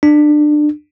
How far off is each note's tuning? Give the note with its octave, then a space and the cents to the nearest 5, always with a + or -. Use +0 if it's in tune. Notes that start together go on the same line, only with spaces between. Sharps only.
D4 +25